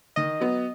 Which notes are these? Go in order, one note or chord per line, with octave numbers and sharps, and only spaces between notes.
D#3 D#5
F#3 B3